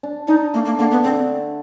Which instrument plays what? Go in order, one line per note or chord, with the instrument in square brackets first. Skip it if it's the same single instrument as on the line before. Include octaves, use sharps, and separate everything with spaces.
[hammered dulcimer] D4
[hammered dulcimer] D4 [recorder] D#4
[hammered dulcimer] A3 [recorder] A#3
[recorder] A#3
[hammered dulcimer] D3 [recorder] A#3
[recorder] B3
[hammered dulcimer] D3 [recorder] C4